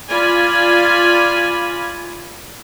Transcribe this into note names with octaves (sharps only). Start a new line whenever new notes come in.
F4 D5 G#5 B5